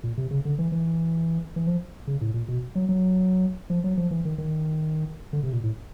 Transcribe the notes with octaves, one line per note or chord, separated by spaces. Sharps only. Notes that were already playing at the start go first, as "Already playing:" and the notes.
A#2
C3
C#3
D3
E3
E3
E3
F3
C#3
A2
A#2
B2
F#3
F#3
F3
F#3
F3
E3
D#3
D#3
D3
C3
A#2
A2